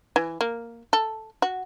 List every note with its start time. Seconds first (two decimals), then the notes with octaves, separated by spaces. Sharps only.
0.16 E3
0.41 A#3
0.93 A4
1.42 F#4